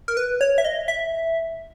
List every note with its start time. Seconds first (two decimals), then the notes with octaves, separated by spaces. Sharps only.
0.08 A#4
0.17 B4
0.41 C#5
0.58 E5
0.65 D#5
0.88 E5